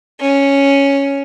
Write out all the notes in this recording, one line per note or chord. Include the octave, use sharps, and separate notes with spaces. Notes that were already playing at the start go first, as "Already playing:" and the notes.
C#4